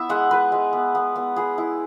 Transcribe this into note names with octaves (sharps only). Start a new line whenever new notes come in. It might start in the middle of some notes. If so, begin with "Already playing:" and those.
Already playing: B3 E4 E5
G#3 F#5
G#3 B4
G#3
B3
B3
B3
B3 G#4
E4